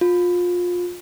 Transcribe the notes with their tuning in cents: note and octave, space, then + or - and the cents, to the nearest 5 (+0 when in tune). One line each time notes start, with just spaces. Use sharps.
F4 +25